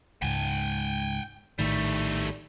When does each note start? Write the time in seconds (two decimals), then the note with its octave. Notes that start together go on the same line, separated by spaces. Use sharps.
0.22 C#2 G#2 G5 G#5
1.59 A#1 A2 D#3 G3 A3